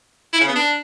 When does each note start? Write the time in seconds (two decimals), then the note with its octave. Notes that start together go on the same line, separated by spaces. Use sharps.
0.33 E4
0.41 C#3
0.48 B3
0.55 D4